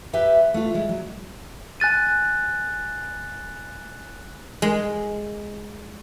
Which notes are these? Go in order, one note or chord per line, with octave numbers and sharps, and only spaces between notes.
G4 B4 E5 G5
A3 F4
G3 G#3
F#3
G#5 F#6 A6 D#7
G#3